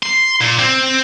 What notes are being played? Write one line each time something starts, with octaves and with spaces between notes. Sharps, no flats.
C6
A#2
C4